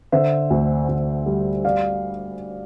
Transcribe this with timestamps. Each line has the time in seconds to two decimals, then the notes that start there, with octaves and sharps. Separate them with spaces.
0.12 D3 C5 E5
0.50 D2
0.89 D2
1.26 G3
1.65 D5 F5